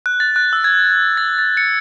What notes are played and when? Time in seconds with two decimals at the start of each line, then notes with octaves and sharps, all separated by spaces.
0.06 F#6
0.20 A6
0.36 F#6
0.53 E6
0.64 G#6
1.17 A6
1.38 A6
1.57 C#7